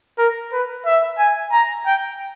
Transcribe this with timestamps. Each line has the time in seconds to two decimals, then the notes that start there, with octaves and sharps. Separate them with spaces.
0.18 A#4
0.52 B4
0.86 E5
1.19 G#5
1.52 A#5
1.86 G5